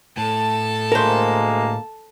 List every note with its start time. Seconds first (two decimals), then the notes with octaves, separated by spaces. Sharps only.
0.17 A2 A4 A5
0.92 D2 G#3 A#3 A#4 C5